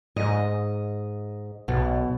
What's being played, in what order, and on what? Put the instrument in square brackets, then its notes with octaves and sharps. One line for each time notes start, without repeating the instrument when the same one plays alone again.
[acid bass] G#2 [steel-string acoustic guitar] D#5
[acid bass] B1 [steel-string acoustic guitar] B2